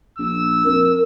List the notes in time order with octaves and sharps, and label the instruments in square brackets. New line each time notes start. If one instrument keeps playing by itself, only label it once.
[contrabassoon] A#1 [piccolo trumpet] E6
[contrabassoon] F2 [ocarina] A#4